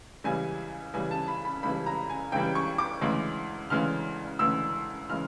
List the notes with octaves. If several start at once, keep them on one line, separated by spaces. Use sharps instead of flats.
C#2 C#3 E3 G3 G#5
C#2 C#3 E3 G3 G#5
A5
B5
B5
C#2 C#3 E3 G3 B5
A#5
G#5
C#2 C#3 E3 G3 G5
C#6
D6
D2 C#3 E3 G#3
D2 C#3 E3 G#3 F6
D2 C#3 E3 G#3 E6
C#3 E3 G#3 F6